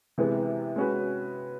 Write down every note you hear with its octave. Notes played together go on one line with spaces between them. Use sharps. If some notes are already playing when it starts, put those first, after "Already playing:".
C3 E3 G#3 B3
G#3 C#4 F#4 B4